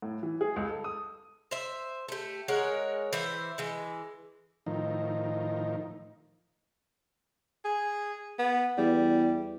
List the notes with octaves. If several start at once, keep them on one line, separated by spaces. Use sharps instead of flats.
A2
E3
G#4
C#2
A4
D#6
C5 E5
A3 G4
G#3 A#4 C#5 F#5
E3 C5 E5
E3 G#3
A2 D#3 F3 D#4
G#4
B3
E2 G3